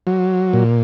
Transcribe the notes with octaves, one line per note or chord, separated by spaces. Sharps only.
F#3
A#2